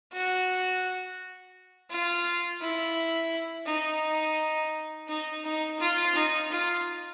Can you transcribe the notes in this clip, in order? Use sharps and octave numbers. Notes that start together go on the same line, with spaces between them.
F#4
F4
E4
D#4
D#4
D#4
F4
D#4
F4